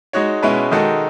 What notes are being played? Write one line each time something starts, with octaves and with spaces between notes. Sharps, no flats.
G#3 D#4 F#4 C#5
B2 G#3 C#4 E4 B4
D#3 G#3 D#4 F#4 A4